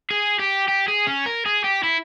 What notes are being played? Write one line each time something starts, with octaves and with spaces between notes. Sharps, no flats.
G#4
G4
G4
G#4
C#4
A#4
G#4
G4
E4